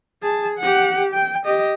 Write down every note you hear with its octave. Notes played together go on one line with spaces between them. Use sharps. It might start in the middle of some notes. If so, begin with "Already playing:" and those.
G#4 A5
G4 F#5
G5
G4 D#5